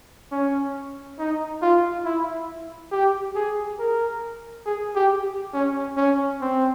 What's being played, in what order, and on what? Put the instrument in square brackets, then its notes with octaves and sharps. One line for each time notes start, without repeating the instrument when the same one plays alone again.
[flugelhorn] C#4
D#4
F4
E4
G4
G#4
A#4
G#4
G4
C#4
C#4
C4